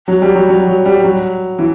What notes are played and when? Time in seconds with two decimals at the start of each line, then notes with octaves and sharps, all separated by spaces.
0.08 F#3
0.22 G3
0.35 F#3
0.49 F#3
0.67 F#3
0.85 G3
1.04 F#3
1.59 E3